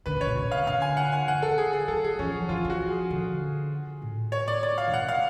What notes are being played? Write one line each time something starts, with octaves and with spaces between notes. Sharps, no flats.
D3 B4
C#3 C#5
B2
C#3
F5
D3 F5
G#5
F#5
G#5
D3 F#5
C#3
D3 A4
G#4
G#4
F#3 A4
G#4
F3 C#4
F3 F4
F#3
F3
F#4
G#4
D3
A2
C#5
D5
D5
F5
D3
C#3 F#5
F5